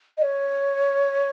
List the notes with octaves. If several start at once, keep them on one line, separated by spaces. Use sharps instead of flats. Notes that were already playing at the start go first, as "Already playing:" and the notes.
D#5
C#5